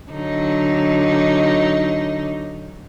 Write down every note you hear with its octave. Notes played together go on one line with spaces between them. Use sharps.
D3 F#3 D#4